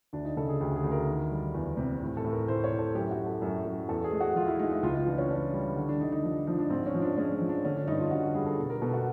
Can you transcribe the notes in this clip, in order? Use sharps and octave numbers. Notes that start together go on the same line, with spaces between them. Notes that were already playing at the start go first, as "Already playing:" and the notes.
D2 D4
D#4
C#3 A4
G#4
D2 G4
G#4
D2
A#4
D#3
G3
E2
C3
A2
A4
A2
A#4
A2 C5
C#5
A2
A4
F#2 G4
F#4
F#3
A4
F#2
F#2
E2 A4
G#4
G#3
F#4
F3 F4
E4
G#3 D#4
D#4
C#2 F4
F4
E3 D4
C#4
E3 D4
G3
D3
D4
D3 D#4
D#4
F3
F3 D#4
D4
G#2 C4
C#4
F3
D4
G#3 C#4
F3
D4
D3 C#4
D4
G2 D#4
F4
D3 F#4
F#4
G3 G#4
A4
B2
A#4
B2 A4
F#4